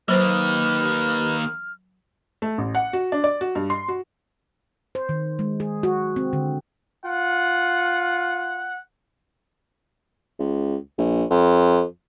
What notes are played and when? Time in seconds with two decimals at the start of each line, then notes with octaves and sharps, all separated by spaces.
0.08 D#3 F#3 A#3 B4 C5 F6
2.42 A3
2.58 A1
2.75 F#5
2.93 F#4
3.12 D4
3.24 D5
3.41 F#4
3.55 G2
3.70 C6
3.88 F#4
4.95 C5
5.09 D#3
5.39 G#3
5.60 G#4
5.83 F#4
6.16 C4
6.33 D3
7.05 F4 F#5
10.39 C#2
10.98 A#1
11.31 F2